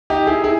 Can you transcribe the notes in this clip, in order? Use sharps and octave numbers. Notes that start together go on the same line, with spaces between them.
D#4 G4
E4 G#4
E4 G#4